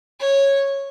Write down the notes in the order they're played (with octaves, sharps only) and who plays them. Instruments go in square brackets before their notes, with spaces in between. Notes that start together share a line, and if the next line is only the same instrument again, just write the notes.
[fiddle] C#5